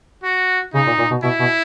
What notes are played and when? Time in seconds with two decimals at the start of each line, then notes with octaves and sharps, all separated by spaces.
0.24 F#4
0.74 C#3 D#4
0.86 A#2
0.98 A#2
1.11 B2
1.23 B2 E4
1.40 B2